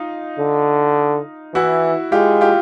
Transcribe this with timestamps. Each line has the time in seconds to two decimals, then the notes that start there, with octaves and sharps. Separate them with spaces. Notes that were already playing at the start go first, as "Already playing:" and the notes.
Already playing: D#4 F4
0.39 D3
1.54 E3 E4 F#4
2.12 G#3 F4 G4
2.41 F4 G4